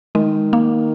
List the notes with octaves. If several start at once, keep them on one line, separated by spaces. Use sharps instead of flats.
D#3 G#3
A#3